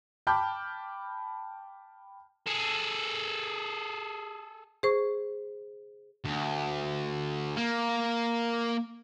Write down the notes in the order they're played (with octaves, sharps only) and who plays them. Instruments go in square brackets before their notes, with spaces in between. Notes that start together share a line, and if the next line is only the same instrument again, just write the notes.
[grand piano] G5 A5 B5 D6 F6 G6
[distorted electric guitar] G#4 A4
[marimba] G#4 C5 C#6
[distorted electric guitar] D2
A#3